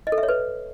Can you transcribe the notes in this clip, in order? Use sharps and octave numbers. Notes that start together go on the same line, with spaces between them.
D#5
A4
E5
C#5
B4